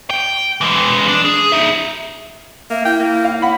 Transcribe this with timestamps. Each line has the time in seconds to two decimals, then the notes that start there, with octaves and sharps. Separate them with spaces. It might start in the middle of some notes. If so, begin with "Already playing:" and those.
0.10 G5
0.61 E3 G#3
1.08 D4
1.25 G#4
1.52 D#4 E5
2.70 A#3 E5
2.85 E4 G5
3.00 A#3
3.24 F5
3.42 F#5 B5